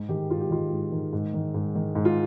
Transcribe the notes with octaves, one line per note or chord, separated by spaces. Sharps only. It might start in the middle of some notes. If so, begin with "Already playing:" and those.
Already playing: G#2
D#3 G4
G#2 F4
G4
D#3 F4
G#2
D#3
G#2
D#3
G#2
D#3
G#2
F4